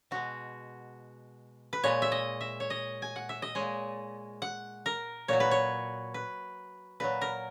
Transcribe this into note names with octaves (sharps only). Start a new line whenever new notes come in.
B2 G#3 F#4
B4
A#2 G#3 C#5
E5
D#5
E5
C#5
D#5
G#5
F#5
E5
D#5
A#2 G#3 C#5
F#5
A#4
A#2 F#3 C#5
B4
C#5
B4
A#2 F#3 B4
A#4